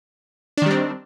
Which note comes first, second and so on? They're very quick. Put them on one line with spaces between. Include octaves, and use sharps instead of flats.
D4 D#3 G3 C4